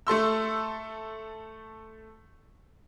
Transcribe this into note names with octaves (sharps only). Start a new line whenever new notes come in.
A3 A4 C6 E6